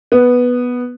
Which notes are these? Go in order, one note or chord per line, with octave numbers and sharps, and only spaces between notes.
B3